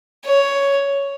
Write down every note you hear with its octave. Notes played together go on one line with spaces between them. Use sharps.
C#5